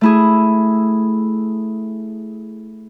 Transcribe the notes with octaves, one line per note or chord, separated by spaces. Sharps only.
A3 E4 G#4